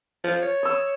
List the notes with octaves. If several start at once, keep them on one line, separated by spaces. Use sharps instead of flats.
F3
C#5
D#5 E6